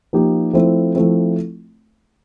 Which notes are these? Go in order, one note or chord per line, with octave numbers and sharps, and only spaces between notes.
F3 A#3 D#4 G4
F3 A3 C4 E4
F3 A3 C4 E4